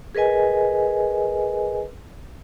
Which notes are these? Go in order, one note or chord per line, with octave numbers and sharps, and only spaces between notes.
G#4 A#4 B4 D#5 G#5